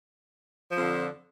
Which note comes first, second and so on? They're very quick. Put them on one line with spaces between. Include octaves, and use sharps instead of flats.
F3 F2 D3